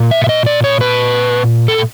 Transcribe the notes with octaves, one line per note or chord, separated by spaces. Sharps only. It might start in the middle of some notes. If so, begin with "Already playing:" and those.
Already playing: A#2
E5
E5
D#5
D5
C#5
B4
A4